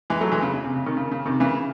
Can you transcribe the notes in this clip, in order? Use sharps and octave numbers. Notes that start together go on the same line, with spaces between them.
E3 G#3
F#3 A3
E3 G#3
C#3
C#3
C3
C#3
C3 D#3
C#3
C#3
C3 D#3
C#3 E3